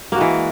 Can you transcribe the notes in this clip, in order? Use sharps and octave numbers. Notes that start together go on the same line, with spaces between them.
E3 G#3 A#3 F#4